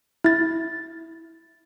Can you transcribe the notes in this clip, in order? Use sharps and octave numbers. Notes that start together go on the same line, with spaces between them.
E4 A6